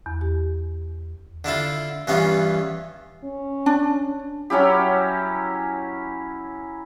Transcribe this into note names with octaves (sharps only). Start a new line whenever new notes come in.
E2
G4
D3 D4 E4 F4
G2 E3 B3 C#4 F4
C#4
D4
F#3 C#4 E4 G4